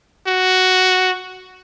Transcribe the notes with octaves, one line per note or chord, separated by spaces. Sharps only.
F#4